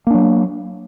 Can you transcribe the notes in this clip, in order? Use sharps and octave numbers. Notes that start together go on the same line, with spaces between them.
F#3 A#3 D4